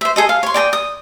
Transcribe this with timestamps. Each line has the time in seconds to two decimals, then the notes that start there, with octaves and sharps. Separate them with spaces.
0.01 C5 E5
0.16 G#4 A4 D#5
0.29 F5
0.43 C#5 C6
0.54 D5 G5 A5 D#6
0.73 D#6